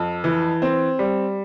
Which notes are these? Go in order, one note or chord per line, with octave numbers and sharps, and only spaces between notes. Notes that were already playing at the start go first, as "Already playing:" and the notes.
Already playing: F2
E3
C4
G3